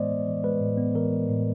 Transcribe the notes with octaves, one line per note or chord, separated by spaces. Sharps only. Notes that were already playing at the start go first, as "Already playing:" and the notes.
Already playing: A2 E3 G#3 B3 C5 D5 D#5
B3
E3
G#3 B4
A2
B3
E3 A#4
G#3
A2